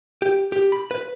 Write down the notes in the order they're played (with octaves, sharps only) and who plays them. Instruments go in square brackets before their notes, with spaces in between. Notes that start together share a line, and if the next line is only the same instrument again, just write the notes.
[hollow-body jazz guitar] G4
G4
B5
B4